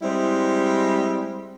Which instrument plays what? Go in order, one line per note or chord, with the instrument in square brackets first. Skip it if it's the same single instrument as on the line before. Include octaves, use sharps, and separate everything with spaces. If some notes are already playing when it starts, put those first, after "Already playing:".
[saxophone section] G3 G#3 C4 E4